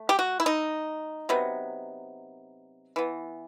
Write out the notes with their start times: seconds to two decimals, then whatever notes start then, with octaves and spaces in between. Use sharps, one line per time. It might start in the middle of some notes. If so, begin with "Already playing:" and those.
Already playing: A3
0.09 G4
0.19 F#4
0.40 E4
0.46 D#4
1.29 C3 F#3 B3
2.96 E3 B3